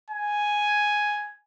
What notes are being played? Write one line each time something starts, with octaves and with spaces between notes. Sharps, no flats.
G#5